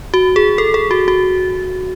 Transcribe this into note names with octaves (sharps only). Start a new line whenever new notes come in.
F#4
G#4
A4
G#4
F#4
F#4